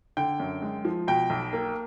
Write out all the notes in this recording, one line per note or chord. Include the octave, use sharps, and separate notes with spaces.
D3 G5
F#2
G#3
F3
B2 G5
B1
A#3